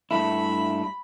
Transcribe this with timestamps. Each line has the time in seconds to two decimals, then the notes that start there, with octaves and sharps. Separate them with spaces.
0.11 G2 A3 E4 B5